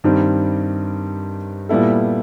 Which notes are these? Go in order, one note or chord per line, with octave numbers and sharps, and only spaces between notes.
G2 D#3 G3 C4
A#2 G3 B3 E4 A4